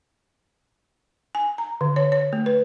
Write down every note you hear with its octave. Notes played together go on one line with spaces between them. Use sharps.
G#5
A#5
D3
C#5
C#5
A3
B4